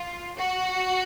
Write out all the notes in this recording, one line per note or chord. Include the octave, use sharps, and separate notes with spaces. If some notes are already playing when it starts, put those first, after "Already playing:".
Already playing: F4
F#4